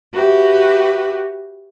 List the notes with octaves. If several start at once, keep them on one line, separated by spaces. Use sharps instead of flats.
F#4 G4 B4 E5